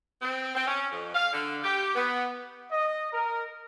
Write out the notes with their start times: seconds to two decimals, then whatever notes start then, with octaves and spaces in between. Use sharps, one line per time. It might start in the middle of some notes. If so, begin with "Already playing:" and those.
0.22 C4
0.55 C4
0.67 C#4
0.92 F2
1.15 F5
1.33 D3
1.64 G4
1.95 B3
2.70 D#5
3.12 A#4